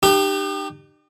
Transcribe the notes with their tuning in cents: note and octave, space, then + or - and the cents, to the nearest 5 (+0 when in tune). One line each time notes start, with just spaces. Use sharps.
D#4 -45 G4 +0